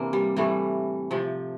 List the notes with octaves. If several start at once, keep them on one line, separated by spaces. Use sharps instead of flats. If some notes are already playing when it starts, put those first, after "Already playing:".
Already playing: C3 E3 A#3 C4 D4
G3
A2 E3 G3 A3
C3 F3